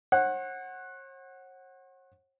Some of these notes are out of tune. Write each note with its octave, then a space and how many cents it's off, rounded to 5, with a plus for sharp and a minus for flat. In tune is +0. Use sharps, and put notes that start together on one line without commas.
C#5 -45 F#5 +0